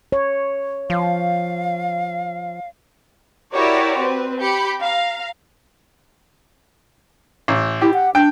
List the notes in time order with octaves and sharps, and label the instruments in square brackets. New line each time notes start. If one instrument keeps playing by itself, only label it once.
[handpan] C#5
[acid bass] F3 [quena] F5
[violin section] E4 F#4 G4 A#4 C#5 D5
C4 B4
G4 B5 G6 C#7
F5 A#5
[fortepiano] A1
[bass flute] E4 [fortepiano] G4
[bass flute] F#5
[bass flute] D4 [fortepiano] G5